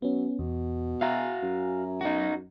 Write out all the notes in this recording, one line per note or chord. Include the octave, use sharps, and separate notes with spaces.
F#3 B3 C#4
E2 B2
F#4 E5 F5 G#5 A#5
F#2
D#4 F#4